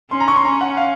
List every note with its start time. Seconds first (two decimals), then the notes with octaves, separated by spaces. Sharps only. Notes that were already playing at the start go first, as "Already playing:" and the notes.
0.11 C#4 C6
0.20 A#5
0.28 C#6
0.36 C6
0.45 C#4 A#5
0.61 F#5
0.77 F5